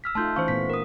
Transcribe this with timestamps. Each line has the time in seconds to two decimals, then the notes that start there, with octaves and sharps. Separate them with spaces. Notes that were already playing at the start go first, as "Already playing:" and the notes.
0.04 E6 F6 B6
0.15 A3 D#4 F4 A5 C6 G6
0.36 E3 C#4 C5 F5 C#6
0.48 A#2 A3 B3 B6
0.70 A#4 D#6